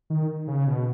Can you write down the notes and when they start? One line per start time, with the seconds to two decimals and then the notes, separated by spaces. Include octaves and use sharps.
0.10 D#3
0.47 C#3
0.67 B2